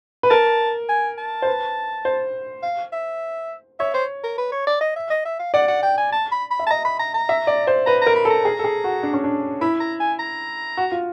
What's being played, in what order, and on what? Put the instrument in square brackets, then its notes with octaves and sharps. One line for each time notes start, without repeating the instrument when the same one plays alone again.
[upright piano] B4
[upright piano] A#4 [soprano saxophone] A5
[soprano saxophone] G#5
A5
[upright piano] C5
B4
C5
[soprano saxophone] F5
E5
[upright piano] C#5 [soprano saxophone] E5
[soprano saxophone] C5
A#4
B4
C#5
D5
D#5
E5
D#5
E5
F5
[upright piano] D5 [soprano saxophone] F#5
[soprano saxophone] F#5
G5
G#5
A5
B5
B5
[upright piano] E5
[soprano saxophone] A5
[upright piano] D#5 [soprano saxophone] A#5
[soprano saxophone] B5
A#5
A#5
[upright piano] E5
D5
C5
[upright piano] B4 [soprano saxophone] A#5
[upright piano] A#4 [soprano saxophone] A#5
[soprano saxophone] B5
[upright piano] A4
[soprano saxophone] A#5
[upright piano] G#4
A4
G#4
F#4
D4
C#4
D4
[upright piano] E4 [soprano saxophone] B5
[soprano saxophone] A#5
G#5
A#5
[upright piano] F#4
F4